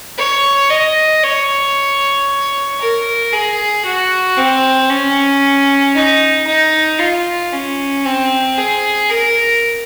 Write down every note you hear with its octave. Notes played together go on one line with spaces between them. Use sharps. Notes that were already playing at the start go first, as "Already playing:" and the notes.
C#5
D#5
C#5
A#4
G#4
F#4
C4
C#4
D#4
D#4
F4
C#4
C4
G#4
A#4